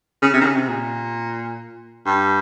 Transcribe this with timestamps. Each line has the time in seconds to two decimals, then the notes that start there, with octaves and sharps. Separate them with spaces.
0.22 C#3
0.34 C3
0.41 D#3
0.45 C#3
0.57 C3
0.68 A#2
2.06 G2